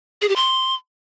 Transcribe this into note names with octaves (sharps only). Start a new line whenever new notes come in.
G#4
G4
C6